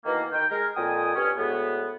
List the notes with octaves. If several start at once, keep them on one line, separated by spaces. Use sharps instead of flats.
B2 D#3 E3 A#3
D#3 G5
G#3 A#4
F2 A#2 G5 G#5 D#6
G2 C#4
D2 A2 G#3 B3